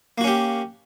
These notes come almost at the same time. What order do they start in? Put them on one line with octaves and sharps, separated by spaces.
A#3 F#4 C#4 G4